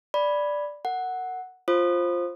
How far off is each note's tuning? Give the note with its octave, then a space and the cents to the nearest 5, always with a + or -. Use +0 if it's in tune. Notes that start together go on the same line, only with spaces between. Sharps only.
D5 +0 B5 +0
A#4 -25 F#5 +0
F4 +0 C5 +15 D#6 -25